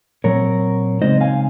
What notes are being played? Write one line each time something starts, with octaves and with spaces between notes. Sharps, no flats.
A#2 F#3 C4 A#4 C#5
C#3 G#3 C4 D#4 C5 D#5
F5 G#5